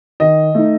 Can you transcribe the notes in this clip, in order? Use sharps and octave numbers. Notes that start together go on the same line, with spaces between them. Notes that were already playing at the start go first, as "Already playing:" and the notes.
D#3 D#5
A3 D#4